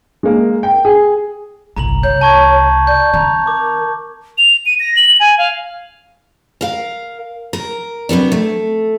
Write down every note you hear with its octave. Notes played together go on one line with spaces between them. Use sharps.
G#3 A#3
G5
G#4
G1 C2 A#5 F#7
C2 C#5 G6
A5 C#6 G#6
D5 G6
D#3 C4 A#5
A#4 D6
F7
D#7
A#6
F#7
G#5
F5
A#4 F5
A#4
C3 F#3 B3 D4
A3